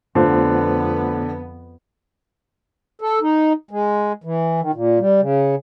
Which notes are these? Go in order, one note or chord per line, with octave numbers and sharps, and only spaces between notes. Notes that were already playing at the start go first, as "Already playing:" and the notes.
F2 D3 A3 B3 F4 C5
A4
D#4
G#3
E3
D#3
A#2
G3
C#3